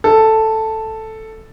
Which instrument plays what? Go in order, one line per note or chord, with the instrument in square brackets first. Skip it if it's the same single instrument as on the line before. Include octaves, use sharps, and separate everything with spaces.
[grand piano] A4